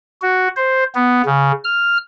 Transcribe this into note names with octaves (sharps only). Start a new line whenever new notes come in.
F#4
C5
B3
C#3
F6